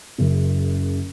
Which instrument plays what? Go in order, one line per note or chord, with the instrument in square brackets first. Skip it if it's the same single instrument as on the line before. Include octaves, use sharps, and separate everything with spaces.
[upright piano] F#1 F#2 C#3